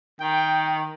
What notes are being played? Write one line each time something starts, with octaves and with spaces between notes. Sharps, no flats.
D#3 G5